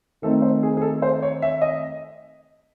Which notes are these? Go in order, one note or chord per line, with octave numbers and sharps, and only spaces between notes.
D#3 A3 C4 D#4 A4
C5
G#4
G#4
A4
C5
C#5
E5
D#5